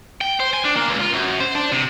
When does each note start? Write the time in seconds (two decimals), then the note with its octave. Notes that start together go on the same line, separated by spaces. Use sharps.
0.21 G5
0.40 C5
0.54 G#5
0.65 D4
0.77 A#3
0.89 C#2
1.01 F4
1.14 F#2
1.40 C5
1.55 D4
1.72 C3